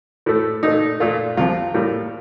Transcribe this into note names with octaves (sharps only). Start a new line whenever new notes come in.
A2 A3
A#2 A3 D#4
A#2 A3 F4
C2 C3 F3 F4
A2 G3 A#3